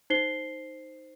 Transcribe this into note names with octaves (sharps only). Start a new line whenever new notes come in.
D#4 C5 C7 G7